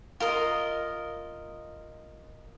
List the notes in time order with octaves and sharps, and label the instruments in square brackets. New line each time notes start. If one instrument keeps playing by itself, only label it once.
[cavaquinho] F4 A#4 D#5